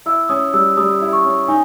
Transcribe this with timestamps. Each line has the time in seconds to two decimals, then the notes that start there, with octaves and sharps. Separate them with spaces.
0.06 E4 E6
0.29 C#4 D#6
0.54 G3 E6
0.77 G3 D#6
1.01 E4
1.13 C#6
1.25 C#4
1.48 D#4 G#5